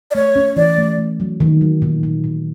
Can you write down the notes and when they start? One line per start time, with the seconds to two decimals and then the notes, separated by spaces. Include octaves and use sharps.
0.11 D5
0.15 A3 C#5
0.36 C#4
0.56 E3 D5
0.78 A3
0.98 A3
1.20 F#3
1.40 D#3
1.61 F#3
1.82 A#2
2.03 A#2
2.24 A#2